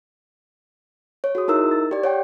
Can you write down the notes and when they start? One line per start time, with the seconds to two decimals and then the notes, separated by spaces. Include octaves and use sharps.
1.24 C#5
1.35 F#4 G#4 D#6
1.48 D#4 E4 A#4 E6
1.71 A6
1.91 G4 D5
2.04 C#5 F#5 G5